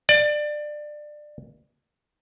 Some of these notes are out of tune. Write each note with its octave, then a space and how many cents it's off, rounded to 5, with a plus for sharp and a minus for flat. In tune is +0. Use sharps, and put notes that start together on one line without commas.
D5 +20